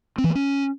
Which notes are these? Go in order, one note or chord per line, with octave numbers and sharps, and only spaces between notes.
C4
E3
A#3
C#4